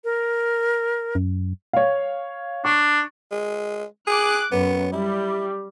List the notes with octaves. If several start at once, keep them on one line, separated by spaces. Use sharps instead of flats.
A#4
F#2
C#5 F5
D4 C#6
G#3
G#4 D6 F#6
F#2 B3
G3 E4